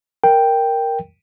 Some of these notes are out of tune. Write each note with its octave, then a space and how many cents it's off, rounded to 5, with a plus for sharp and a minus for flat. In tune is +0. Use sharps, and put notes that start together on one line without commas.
A#4 +0 G5 +0